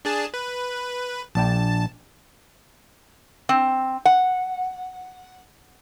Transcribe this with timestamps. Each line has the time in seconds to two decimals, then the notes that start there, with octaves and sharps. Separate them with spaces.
0.05 D4 G#4 A5
0.34 B4
1.35 A#1 D4 G5 A5
3.49 C4
4.05 F#5